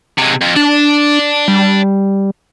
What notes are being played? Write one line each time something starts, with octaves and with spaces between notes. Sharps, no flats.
C3 G#3
F2
D4 D5 A5
G3